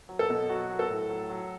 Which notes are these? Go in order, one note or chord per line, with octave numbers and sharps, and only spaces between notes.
F#3
A4
B2
F#3 F#4
F#3
A4
A2
F#3
F#3